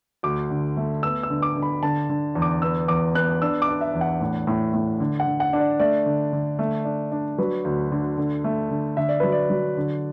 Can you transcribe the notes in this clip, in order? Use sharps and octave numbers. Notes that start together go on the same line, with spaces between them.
D2 D6
D3
A3
B3 E6
E6
D3
D6
D3
B5
D3 A5
D3
E2
D6
B3 E6
E2 D6
B3 F#6
D4 E6
D6
D4
E5
E2
F#5
A2
A2
A2
D3
F#5
D3
F#5
D4
D5
A3 D5
D3
D3
A3
D4
D4
F#3 B4
D2
D3
D3
A3
D3
D3 E5
D5
F#3 B4
D5
F#3
D3